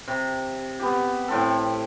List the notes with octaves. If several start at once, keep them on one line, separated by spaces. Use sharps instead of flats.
C3
B3 G4
A2 C4 A4